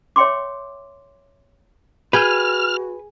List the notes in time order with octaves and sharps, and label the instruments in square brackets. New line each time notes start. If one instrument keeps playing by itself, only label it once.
[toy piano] C#5 E5 G5 C6 D6
[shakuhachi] F#4 [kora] G#4 G5 [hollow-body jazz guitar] B4 [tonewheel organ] F6